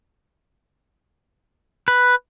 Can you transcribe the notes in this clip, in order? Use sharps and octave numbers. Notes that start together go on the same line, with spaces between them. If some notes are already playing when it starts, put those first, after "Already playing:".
B4